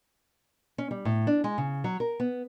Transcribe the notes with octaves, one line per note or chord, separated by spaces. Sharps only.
C#4
G3
A2
D4
G#3
C#3
F#3
A#4
B3